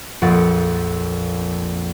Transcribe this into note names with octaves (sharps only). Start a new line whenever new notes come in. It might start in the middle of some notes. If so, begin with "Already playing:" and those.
A#1 F2 F#5 A6